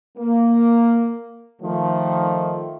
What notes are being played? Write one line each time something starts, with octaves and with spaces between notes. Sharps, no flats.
A#3
D#3 F3 A3